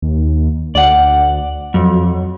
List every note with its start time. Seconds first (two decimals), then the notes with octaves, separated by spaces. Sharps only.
0.02 D#2
0.75 D2 D5 F#5
1.74 F2 F#3